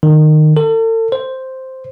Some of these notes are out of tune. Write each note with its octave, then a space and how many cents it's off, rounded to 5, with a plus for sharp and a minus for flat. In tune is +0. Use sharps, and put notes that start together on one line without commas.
D#3 -20
A4 +40
C5 +0